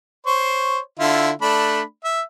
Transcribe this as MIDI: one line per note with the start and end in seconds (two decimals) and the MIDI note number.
0.26 0.78 72
0.26 0.78 73
0.99 1.31 50
0.99 1.31 64
0.99 1.31 65
1.42 1.81 57
1.42 1.81 62
1.42 1.81 83
2.04 2.21 76